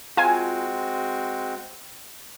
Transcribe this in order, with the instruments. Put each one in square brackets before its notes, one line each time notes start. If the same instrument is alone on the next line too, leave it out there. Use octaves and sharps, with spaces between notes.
[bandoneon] G#3 C4 F#4 [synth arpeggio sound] F4 G#5